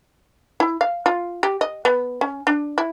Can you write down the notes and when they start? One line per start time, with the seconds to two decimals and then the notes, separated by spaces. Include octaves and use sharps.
0.60 E4
0.81 F5
1.06 F4
1.43 G4
1.61 D#5
1.85 B3
2.21 C#4
2.47 D4
2.78 E4